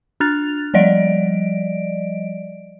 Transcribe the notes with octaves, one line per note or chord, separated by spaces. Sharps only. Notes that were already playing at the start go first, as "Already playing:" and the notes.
D4 F6 F#6 A6 F7
F3 G3 D5 D#5 D7